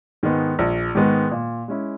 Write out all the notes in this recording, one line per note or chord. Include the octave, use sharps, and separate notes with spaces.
G#2 D#3 G#3 B3
A#1
G#2 D#3 G#3 B3
A#2
G#3 C#4 E4